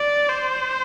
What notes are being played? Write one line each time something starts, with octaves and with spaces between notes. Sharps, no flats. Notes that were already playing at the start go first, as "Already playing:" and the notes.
Already playing: D5
C5